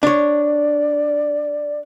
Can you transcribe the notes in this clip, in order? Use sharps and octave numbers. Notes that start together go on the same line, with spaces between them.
D4 C#5 D5